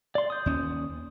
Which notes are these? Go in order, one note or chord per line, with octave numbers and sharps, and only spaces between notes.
D5 C6
D#6 G6
D#2 C#4